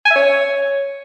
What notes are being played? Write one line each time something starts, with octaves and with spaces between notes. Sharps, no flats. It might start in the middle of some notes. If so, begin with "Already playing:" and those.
G#5
E5
C#5